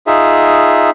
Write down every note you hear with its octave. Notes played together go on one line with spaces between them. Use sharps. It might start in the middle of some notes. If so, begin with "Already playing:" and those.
D#4 F4 G#4 E5